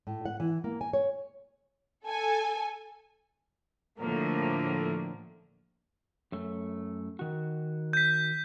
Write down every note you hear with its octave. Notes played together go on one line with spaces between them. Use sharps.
A2
F#5
E3
A#3
G#5
C#5
A4 G#5
A2 D3 F3 A#3
F#2 A3
D#3 F#4
G6 B6